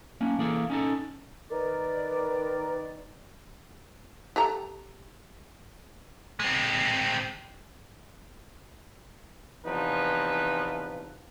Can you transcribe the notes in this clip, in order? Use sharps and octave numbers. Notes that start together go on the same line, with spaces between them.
A#3 C#4 D4
E3 A#3 G#4 A4
C#4 D#4 A4
D#3 A#4 B4 D5
G4 A4 A#5
G#3 C4
E2 C3 F3 D#4 B4